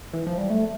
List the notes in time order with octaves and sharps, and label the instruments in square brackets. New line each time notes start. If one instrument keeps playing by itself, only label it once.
[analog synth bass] E3
F3
G3
A3